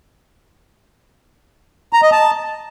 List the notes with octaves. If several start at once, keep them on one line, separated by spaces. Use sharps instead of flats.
A#5
D#5
A5